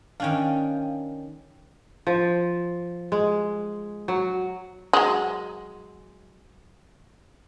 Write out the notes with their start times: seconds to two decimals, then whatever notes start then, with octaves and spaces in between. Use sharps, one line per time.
0.20 D#3 C#4 D4 F5 G5
2.07 F3
3.12 G#3
4.08 F#3
4.93 F#3 G#3